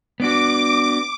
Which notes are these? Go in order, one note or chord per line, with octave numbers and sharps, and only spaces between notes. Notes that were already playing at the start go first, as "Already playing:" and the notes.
B3 D4 F#4 D6